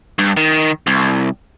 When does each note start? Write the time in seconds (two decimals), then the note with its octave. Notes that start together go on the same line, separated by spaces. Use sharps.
0.19 G2
0.37 D#3
0.87 C2